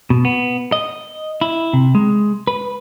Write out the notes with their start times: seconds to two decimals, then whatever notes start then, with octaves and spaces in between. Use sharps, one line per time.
0.10 B2
0.25 B3
0.72 D#5
1.41 E4
1.73 C3
1.95 G#3
2.47 B4